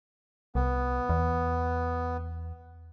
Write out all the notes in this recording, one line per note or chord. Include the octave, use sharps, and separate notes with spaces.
C2 B3
E2